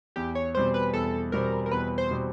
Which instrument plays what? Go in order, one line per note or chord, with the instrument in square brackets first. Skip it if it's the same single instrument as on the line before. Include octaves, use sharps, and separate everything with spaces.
[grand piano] E2 [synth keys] G4
[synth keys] C#5
[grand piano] B2 G3 C4 [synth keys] C5
[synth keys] B4
[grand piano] E2 [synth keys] A4
[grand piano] B2 G3 C4 [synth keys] A#4
[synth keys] A#4
[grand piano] E2 [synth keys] B4
[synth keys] C5
[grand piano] B2 G3 C4